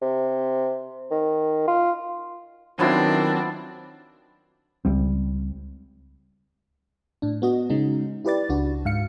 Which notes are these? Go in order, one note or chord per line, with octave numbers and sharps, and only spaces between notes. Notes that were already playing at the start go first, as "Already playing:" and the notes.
C3
D#3
F4
D#3 F3 F#3 B3 C4 D4 E4
C#2 G3 C4
A2 D4
B3 F#4 D#5
C#3 G#3 C#4 D#4
E4 G4 B4 D5 A6
C#2 D4 F#4
G#2 F5 C#7